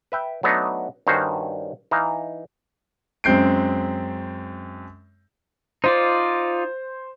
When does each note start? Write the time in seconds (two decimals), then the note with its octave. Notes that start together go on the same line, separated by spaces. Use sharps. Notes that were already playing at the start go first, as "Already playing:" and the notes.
0.12 B4 E5 G5
0.43 F#3 A3 B3 D4 D#4
1.07 G2 D#3 C#4 F#4 C5
1.91 E3 D#4 F5 A#5
3.24 F#2 G#3 C4 G6 C7 D7
5.84 D#4 F4 C5 D5